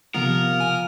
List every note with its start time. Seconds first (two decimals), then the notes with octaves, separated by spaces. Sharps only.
0.14 C3 F3 B3 A#4
0.60 G#5